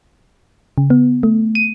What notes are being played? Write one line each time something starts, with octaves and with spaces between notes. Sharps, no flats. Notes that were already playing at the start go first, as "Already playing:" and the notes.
C#3
B3
A3
D#7